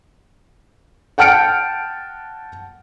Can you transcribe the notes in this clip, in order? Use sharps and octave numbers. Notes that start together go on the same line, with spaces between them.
F#5 G5 A5 F6 C#7 D7